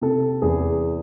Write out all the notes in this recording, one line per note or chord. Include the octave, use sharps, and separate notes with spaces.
C3 A4
E2 G#4